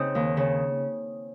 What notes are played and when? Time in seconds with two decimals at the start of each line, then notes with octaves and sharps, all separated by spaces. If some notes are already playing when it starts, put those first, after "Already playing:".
Already playing: C#3 C4 D#4
0.15 D#2
0.37 C#3